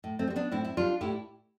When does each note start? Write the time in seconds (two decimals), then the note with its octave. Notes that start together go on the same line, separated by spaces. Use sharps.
0.04 A2
0.19 A3 C4
0.27 G3
0.30 C4
0.36 B3 D4
0.51 A2 C4 E4
0.65 E4
0.77 G3 D4 F4
1.01 A2 E4 G4